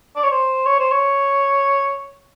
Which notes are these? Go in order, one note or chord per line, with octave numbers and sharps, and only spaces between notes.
D5
C#5
C5
C#5
C5
C#5